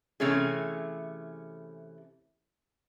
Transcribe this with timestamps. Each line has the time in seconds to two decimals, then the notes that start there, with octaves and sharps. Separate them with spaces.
0.20 C3 E3 A3 C#4 G#4